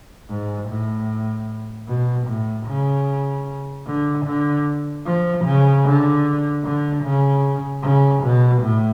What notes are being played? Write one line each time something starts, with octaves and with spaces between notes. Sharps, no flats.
G#2
A2
B2
A2
C#3
D3
D3
F3
C#3
D3
D3
C#3
C#3
B2
A2